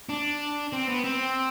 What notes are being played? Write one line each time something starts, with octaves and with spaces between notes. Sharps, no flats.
D4
C4
B3
C4